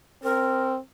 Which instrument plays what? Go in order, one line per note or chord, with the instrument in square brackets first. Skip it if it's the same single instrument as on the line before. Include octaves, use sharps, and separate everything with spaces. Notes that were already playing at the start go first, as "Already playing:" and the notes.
[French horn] C4 [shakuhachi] A#4